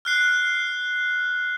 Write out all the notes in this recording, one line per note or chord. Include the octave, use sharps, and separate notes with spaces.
F6 F#6 C7